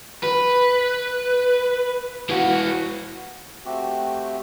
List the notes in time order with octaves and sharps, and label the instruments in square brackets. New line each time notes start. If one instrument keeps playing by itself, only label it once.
[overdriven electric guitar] B4
E3 F#4
[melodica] A3 C4 F#4 G4